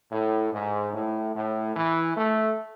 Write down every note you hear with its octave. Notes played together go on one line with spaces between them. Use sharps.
A2
G#2
A2
A2
E3
A3